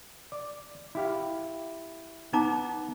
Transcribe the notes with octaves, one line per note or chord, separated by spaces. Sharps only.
D5
E4 G4 F5
B3 D#4 A#5 D6